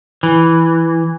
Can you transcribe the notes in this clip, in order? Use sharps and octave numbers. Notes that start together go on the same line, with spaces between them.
E3